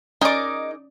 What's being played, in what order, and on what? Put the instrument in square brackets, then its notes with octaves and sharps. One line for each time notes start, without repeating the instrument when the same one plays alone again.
[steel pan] C#4 D5 D#5 [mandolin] D#4 D6 [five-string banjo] G#4 A#4